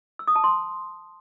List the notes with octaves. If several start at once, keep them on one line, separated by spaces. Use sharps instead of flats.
E6
D#6
A5
C6